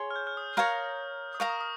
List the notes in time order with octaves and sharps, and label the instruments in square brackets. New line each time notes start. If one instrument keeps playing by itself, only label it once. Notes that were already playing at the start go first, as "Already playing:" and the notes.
Already playing: [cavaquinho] G#4 C#5 C6
[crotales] F6
G6
F6
D#6
[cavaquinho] A#4 C#5 F5 A#5
[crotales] D#6
[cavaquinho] A#4 F5 A#5 [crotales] C#6
[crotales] D#6
D#6